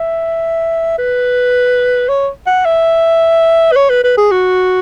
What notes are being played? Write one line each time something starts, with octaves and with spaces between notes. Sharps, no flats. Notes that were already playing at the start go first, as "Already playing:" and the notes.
Already playing: E5
B4
C#5
F#5
E5
B4
C#5
B4
B4
G#4
F#4